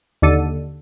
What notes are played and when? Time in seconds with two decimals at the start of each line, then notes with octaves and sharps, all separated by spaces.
0.22 D#2 D3 A4 D#7